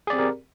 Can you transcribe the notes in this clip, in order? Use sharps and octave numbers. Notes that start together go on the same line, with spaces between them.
C4 G4 G#4 A#4 D5